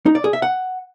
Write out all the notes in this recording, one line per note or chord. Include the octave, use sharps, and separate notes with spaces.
D#4
D5
G#4
E5
F#5